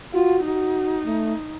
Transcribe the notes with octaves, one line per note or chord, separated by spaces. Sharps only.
F4 F#4
D#4 F#4
A3